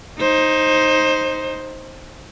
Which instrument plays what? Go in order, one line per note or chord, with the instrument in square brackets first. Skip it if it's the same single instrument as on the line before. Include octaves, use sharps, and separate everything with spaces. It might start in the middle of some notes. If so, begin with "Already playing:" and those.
[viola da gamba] D#4 C5